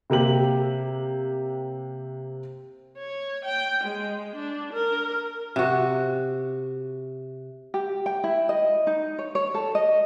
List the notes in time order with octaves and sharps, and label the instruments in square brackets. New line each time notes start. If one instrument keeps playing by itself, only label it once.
[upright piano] C3 A#3 G4 F#7
[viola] C#5
G5
G#3
D4
A#4
[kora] C3 F#4
[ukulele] G4
G5
E4
D#5
D#4
C#5
C#5
A4
D#5